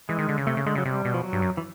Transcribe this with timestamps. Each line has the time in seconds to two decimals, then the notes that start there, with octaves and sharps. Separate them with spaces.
0.09 E3 G#3
0.19 D#3
0.29 D3
0.38 C#3
0.47 C3 A3
0.57 C#3
0.66 D3 G#3
0.75 C#3 F#3
0.85 C3 G3
1.05 B2
1.14 F3
1.23 F#3
1.33 G2
1.42 F#2
1.57 E3